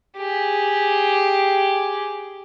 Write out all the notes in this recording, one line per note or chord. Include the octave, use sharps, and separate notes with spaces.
G4 G#4